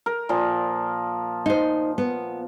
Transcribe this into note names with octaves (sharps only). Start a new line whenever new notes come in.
A#4
A#2 F3
D#4 C5
B3